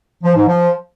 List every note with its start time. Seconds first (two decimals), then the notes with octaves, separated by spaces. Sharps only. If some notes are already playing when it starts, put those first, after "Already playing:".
0.24 F3
0.36 G#2
0.48 F3